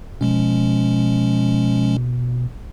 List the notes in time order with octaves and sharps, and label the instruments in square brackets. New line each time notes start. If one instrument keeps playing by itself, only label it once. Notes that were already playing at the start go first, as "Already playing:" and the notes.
[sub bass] B2 [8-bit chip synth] F3 G#3 C#4